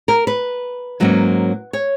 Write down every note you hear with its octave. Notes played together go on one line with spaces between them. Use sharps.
A#4
B4
G#2 F#3 A#3 C#4
C#5